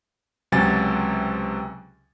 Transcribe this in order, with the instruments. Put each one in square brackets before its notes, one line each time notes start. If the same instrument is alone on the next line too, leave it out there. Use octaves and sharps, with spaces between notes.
[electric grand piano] C#2 C3 F#3 G#5 A6